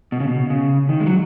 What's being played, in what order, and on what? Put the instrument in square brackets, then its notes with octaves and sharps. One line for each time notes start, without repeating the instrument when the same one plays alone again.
[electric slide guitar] B2
C#3
B2
C#3
D#3
G#3
F#3